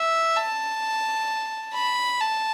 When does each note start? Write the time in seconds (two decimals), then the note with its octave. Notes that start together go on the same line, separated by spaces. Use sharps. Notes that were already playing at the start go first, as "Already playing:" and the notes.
Already playing: E5
0.36 A5
1.74 B5
2.20 A5